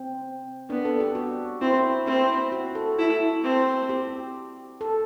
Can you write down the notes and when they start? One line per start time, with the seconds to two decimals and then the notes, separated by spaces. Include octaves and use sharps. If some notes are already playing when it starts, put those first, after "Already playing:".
Already playing: C4
0.70 B3 D4
0.85 A4
1.00 G4
1.15 F#4
1.61 C4 E4
2.06 C4 E4
2.52 F#4
2.75 A4
2.98 E4 A4
3.44 C4
3.89 G4
4.81 A4